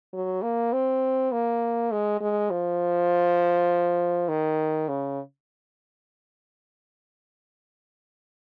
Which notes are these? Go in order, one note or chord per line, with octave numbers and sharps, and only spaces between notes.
F#3
A#3
C4
A#3
G#3
G#3
F3
D#3
C#3